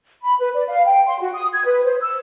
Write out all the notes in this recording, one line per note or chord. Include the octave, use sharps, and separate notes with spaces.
B5
B4
D5
F5
G5
C6
F#4
D#6
G#6
B4
C5
E6